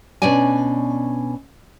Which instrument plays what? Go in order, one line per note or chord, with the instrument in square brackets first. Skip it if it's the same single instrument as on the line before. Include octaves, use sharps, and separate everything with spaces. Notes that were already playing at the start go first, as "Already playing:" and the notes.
[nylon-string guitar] B2 C#4 D4 D5 G#5